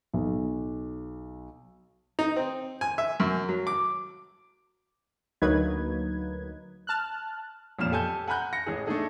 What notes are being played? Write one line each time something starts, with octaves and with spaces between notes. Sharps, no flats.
B1
D#4
C4
G#5
E5
F#2
F#3
D6
D2 F#3 A#3 D#4 B4 G#6
A5 F6 F#6
A1 F2 A#2 F6 E7
G4 A4 G#5 A5 G6
F#5 G#5 A#5 B5 F#6 G6
A#6 C#7
A1 E3 G#4
A3 D4 D#4 G#4 A4